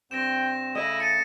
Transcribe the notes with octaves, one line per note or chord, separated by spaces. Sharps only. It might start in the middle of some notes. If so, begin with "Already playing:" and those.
G2 C4 G5 A#6 E7
C#3 A3 E4 D#5
A5 C#7 D#7